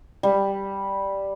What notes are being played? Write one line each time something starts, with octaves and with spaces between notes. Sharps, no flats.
G3